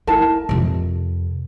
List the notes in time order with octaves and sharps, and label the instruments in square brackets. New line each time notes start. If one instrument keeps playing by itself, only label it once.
[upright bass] E4 [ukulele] A#4 A5
[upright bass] F2 C3